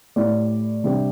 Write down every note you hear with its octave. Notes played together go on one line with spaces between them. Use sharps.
A2 A3 E4 G4 D5
C3 G3 D4 G4